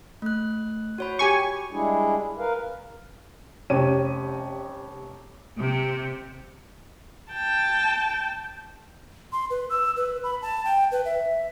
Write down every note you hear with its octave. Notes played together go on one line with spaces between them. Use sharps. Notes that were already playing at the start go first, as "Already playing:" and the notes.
A3 F#6
F#4 C#5 B5
G4 G#5 C#6
G3 G#3 D4 E4 G#4
A#4 B4 F5
F1 C#4 G4 C#5 D#7
C3
G5 A5
C6
B4
E6
B4
B5
A5
G5
B4
E5